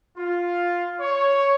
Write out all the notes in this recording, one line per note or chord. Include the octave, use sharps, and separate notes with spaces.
F4
C#5